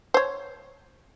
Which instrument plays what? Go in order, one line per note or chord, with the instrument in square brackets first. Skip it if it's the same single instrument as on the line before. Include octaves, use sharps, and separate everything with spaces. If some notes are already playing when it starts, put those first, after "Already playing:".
[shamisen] C5 C#5